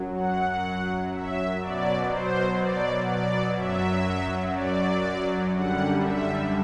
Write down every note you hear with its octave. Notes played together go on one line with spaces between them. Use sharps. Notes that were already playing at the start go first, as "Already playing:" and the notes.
Already playing: F#2 F#3
F#5
E5
B2 F#3 D5
C5
D5
D5
F#2 F#3 E5
D5
F#2 D3 G3 F#5
E5